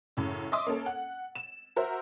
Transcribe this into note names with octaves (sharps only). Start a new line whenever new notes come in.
F#2 A2 C#3
D#5 E5 C6 D6 D#6
A#3 C#4 A4
F#5
E7
F#4 A#4 C5 E5